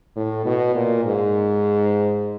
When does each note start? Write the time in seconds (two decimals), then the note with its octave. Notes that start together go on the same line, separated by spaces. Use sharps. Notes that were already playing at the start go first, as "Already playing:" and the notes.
0.16 A2
0.45 B2
0.75 A#2
1.05 G#2